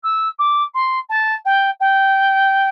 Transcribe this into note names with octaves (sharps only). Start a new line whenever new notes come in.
E6
D6
C6
A5
G5
G5